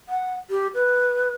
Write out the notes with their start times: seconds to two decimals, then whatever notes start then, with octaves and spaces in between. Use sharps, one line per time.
0.09 F#5
0.50 G4
0.74 B4